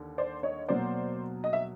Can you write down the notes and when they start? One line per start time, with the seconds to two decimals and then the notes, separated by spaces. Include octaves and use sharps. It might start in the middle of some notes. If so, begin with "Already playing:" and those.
Already playing: D#2 D3
0.18 C5 D5
0.43 C#5 D#5
0.69 B2 F#3 A#3 C5 D5
1.44 D#5
1.53 E5